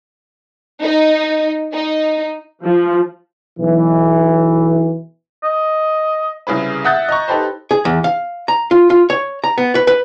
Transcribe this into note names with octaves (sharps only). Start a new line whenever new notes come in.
D#4
D#4
F3
B1 E3
D#5
C2 C#3 G#4 B4
E5 F#5 D#6 F#6 G6 A6
D#5 A#5 C#6
D#4 G4 A4 B4 C5
G#4
E2
F5
A#5
F4
F4
C#5
A#5
B3
B4
B4